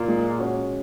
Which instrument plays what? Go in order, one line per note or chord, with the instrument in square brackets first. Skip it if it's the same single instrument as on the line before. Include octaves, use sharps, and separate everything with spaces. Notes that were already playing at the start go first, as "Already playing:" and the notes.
Already playing: [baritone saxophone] A#2
[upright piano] G#3
C#4 F#4